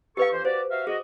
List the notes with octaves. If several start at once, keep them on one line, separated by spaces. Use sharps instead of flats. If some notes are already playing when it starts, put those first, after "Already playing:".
D#4 G4 A4 B4 F5 C#6
F2 E3 C5
F#4 G4 C5 D5
F#4 E5 F5
F#4 G#4 D#5